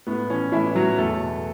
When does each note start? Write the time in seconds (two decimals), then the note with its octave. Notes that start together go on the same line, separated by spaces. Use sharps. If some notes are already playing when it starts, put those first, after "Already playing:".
0.07 A2 B3
0.30 E3 C#4
0.52 A2 E3 E4
0.75 E3 F#3 F#4
0.98 E2 A3 A4
1.20 B2